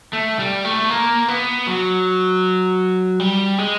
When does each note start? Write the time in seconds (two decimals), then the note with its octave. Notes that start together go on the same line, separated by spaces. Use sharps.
0.13 A3
0.39 G3
0.65 A3
0.90 A#3
1.28 B3
1.67 F#3
3.20 G3
3.58 G#3